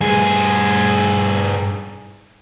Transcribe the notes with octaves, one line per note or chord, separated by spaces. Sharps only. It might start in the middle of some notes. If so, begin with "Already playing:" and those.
G2 G#4